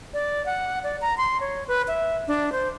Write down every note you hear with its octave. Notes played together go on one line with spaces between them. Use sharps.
D5
F#5
D5
A#5
C6
C#5
B4
E5
D4
C5